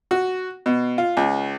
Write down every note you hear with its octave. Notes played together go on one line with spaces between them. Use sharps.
F#4
B2
F4
C#2